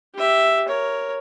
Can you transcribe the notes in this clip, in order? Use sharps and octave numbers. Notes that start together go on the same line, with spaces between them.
G4 E5
A#4 C#5